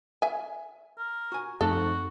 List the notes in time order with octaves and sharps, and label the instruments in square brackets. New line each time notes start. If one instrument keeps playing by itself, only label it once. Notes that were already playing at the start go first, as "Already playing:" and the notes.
[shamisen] E5 G#5
[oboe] A#4
[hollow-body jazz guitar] F#4 G#5
[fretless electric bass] F#2 A3 C4 [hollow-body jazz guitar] F3 D#4 C5 [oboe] F#4 [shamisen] A4